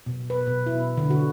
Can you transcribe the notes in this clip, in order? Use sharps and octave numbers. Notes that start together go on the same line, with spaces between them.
B2
B4
B2
E4
D3
F#4